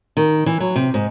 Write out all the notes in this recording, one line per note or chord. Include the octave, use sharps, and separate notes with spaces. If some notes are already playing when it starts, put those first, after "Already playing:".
D#3
E3
F#3
C3
G#2